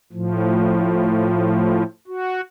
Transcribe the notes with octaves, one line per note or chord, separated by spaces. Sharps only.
A2 F3
F#4